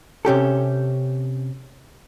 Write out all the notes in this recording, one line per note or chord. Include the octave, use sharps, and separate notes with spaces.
C3 C#4 G4 A4